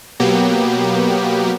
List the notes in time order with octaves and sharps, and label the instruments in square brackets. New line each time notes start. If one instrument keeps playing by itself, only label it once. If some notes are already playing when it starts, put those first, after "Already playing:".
[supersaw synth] B2 F#3 A#3 B3 G4